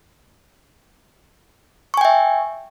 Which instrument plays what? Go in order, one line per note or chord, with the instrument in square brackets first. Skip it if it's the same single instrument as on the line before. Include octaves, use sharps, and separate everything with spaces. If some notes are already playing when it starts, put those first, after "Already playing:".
[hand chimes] C#6
G#5
G5
E5